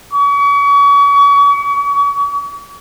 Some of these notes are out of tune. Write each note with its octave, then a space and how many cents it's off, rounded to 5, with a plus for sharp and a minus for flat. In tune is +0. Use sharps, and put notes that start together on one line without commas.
C#6 +40